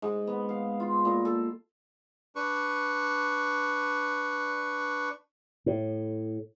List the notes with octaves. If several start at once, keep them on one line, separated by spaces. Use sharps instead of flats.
G#2
B3
F5
F4
A#2
A4
D4 B4 C#6
A2